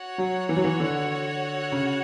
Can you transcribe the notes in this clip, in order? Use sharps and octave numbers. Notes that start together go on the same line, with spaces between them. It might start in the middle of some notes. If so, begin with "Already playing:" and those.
Already playing: F#4 C#5 F#5
F#3
E3
F#3
E3
D3
C#3